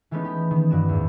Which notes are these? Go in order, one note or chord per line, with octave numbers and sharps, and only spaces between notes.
E3 G#3 A3 B3 C#4 D#4
G4
D#3 B3
G2 F#4 D5 E7
E2 G#2